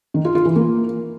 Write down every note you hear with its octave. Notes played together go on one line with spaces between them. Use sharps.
D#3
F4
F4
E3
A#3